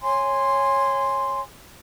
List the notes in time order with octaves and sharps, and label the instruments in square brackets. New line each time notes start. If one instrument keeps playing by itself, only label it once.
[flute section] C#5 G#5 C6